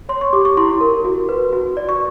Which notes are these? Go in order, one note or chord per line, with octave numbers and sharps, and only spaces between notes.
C#5 C6
C#6
G4 D6
C#6
E4 C6
A#4
F#4
B4
F#4
D5
C#6